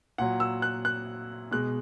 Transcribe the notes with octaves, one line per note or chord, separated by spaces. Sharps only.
A#2 F#3 F#5
E6
F#6
F#6
B2 G#3 F#6